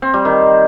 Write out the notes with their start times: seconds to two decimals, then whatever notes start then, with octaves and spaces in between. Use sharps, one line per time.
0.02 C4
0.14 G3
0.25 D#3